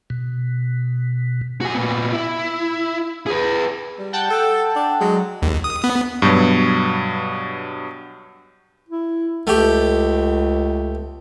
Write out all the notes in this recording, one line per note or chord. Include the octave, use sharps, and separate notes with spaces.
B2
F#4 G#5
A#2 B3
E4
G#4 B4
G3
F#5 G5 A5
A4
D4
F#3 G#3
D#2
D#6
B3
G2 B2 F#3 B3
E4
C#2 A3 G4